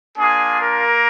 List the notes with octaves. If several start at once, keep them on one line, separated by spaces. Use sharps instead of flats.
A#3 D4 F4 G#4
A#3 A#4